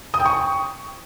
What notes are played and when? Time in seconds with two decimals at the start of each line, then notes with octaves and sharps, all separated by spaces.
0.14 D#6
0.20 G5
0.25 C#6